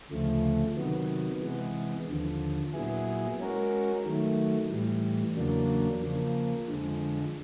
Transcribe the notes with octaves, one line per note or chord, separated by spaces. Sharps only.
D2 C#3 F3 A3
C3 D#3 F#3 B3
C3 E3 G#3 B3
D#2 D3 F3
A#2 F#3 B3 E4 G#4
G#3 C#4 F#4 A#4
D#3 F#3 A3
A2 E3 G3
E2 C#3 F#3 A#3 D4
C#3 F3 A#3
F2 D3 F3 G#3